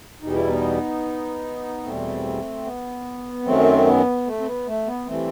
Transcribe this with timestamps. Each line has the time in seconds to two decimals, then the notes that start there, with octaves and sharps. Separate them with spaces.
0.22 E2 B2 G3 D#4
0.35 E4
0.48 B3 D#4
1.83 E2 B2 G3 A3 C4
2.65 B3
3.45 F#2 D#3 F#3 A3 C4
3.86 B3
4.26 A3
4.40 C4
4.46 B3
4.67 A3
4.87 B3
5.07 E3 G3 A3 C4